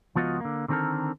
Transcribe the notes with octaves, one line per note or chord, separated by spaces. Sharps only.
C#2 F3 B3 F4 F#4 D#5
D3 A#3
D3 D#3 C4 D4 A4 A#4